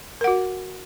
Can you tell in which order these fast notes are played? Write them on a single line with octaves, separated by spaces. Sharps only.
A#4 F#5 F#4